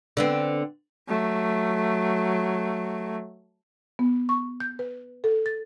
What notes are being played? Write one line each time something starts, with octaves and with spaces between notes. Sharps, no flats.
D3 B3 C4
F#3 A3
B3
C#6
G6
B4
A4
A6